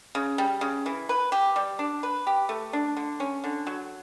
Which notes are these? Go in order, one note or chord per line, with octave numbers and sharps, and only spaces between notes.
C#3
G3
C#3
E3
B4
G4
G3
D4
B4
G4
A3
D4
D3
C#4
D3
F#3